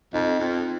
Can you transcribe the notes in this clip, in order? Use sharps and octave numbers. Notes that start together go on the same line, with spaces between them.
F2 D#4
F2